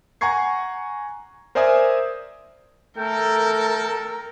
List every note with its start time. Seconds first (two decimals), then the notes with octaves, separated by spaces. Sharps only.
0.21 F#5 G#5 A#5 C#6 G#6 C7
1.55 A#4 C5 D5 E5 G#5 D#6
2.98 A3 A4 A#4 G5